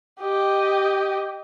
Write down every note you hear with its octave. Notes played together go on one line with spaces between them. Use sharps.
G4 D#5